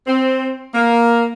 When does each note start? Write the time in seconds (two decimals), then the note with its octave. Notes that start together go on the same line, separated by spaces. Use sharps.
0.07 C4
0.74 A#3